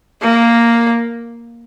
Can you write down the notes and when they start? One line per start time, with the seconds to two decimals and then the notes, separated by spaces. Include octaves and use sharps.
0.21 A#3